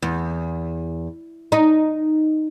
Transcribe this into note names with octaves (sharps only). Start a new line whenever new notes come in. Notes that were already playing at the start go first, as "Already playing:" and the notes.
E2
D#4